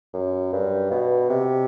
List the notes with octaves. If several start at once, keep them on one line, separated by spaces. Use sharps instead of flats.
F#2
G2
B2
C3